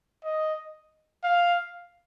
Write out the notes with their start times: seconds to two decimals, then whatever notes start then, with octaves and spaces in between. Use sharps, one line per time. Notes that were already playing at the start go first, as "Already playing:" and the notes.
0.24 D#5
1.23 F5